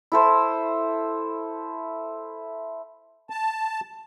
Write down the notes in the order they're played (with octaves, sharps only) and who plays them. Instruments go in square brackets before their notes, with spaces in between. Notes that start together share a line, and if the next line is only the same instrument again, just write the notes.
[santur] E4 A4 C5
[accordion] A5